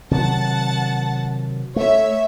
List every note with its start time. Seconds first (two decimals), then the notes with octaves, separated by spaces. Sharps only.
0.11 C3 D#3 F#3 F#5 A5 A6
1.76 A3 C#5 E5